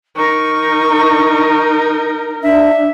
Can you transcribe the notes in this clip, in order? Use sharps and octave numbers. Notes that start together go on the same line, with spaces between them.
D#4 A#4 C#6
D4 E5